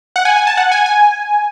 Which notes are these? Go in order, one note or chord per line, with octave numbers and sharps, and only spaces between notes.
F#5
G#5
G#5
A5
F#5
G#5
G#5